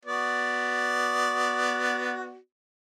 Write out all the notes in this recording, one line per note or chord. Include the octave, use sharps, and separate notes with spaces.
B3 F#4 D5